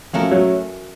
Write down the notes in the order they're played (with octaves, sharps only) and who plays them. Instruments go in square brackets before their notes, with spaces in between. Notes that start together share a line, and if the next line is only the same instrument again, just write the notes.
[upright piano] F3 [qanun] A3 C#4 F#4 A#4
[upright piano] F#3